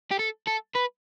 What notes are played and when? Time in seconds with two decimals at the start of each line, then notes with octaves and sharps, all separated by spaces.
0.12 G4
0.19 A4
0.48 A4
0.76 B4